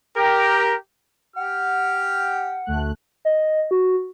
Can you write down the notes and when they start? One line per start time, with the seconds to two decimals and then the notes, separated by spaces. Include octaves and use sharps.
0.17 G4 A#4
1.36 G4 F#5 G5 F6
2.66 D2 A3 F#6
3.25 D#5
3.71 F#4